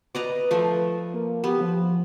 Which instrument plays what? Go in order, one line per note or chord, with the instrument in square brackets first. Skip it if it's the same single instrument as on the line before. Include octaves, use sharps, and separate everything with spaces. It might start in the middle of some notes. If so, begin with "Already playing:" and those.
[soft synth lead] B4 [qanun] D5 D#5 A#5
[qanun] F3 A3
[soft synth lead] A#3
[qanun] B3 [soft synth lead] G4
[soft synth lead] F3